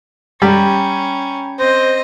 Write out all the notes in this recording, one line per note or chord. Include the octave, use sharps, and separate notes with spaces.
G3 C#4 G5 A#5 B5
C4 C5 D#5